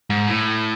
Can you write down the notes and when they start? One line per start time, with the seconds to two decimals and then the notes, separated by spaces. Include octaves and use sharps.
0.10 G#2
0.27 A2